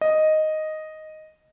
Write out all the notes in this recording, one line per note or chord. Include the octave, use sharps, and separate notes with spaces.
D#5